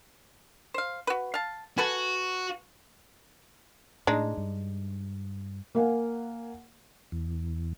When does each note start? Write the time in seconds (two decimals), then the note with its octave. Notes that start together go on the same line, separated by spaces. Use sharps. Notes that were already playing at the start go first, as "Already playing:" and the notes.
0.74 C5 F5
1.07 F#4 B4
1.34 F5 A5
1.78 F#4 A4 B4 G#5
4.07 A2 G#3 D4 D#4
4.37 G2
5.75 A#3 A#4 F5 F#5 G#5
7.12 E2